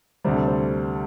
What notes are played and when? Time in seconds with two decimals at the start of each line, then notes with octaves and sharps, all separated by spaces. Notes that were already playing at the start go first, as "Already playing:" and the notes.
0.24 D2 C3 G3 C5
0.36 A4
0.48 C5